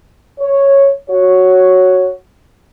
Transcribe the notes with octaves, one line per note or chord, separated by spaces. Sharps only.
C#5
F#4 C#5